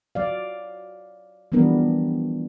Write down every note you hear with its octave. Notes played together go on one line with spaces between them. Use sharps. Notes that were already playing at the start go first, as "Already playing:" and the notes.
F#3 D5 F5
E3 F3 G3 B3 D4 A#4